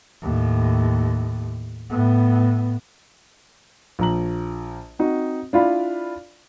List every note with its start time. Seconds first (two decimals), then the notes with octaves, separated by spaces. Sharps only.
0.23 D#2 A2
1.90 A2 B3
3.99 A#1 A#5 F#7
4.99 C4 D#4 F#4
5.53 D4 E4 F4 D5 F5 B5